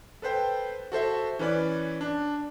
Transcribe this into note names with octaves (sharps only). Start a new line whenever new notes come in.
A4 B4 C5 G5
F#4 A4 C5 E5
E3 C#4 B4 D5 F#6
D4